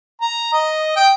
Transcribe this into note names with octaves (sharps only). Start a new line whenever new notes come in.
A#5
D#5
G5